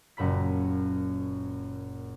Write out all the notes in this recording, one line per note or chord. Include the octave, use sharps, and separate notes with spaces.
F#1 F#2 A#2 B5 B6